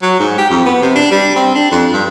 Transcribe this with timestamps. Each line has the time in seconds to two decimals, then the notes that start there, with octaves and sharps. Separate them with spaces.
0.02 F#3
0.19 G#2
0.38 G4
0.50 F2
0.66 B3
0.82 C3
0.95 D4
1.11 G3
1.36 C4
1.55 D4
1.71 F2
1.93 G2